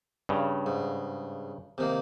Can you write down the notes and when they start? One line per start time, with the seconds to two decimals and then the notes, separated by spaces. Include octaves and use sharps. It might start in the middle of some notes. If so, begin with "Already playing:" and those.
0.29 G2 C#3
0.66 G#2
1.78 C3 D#3 A#3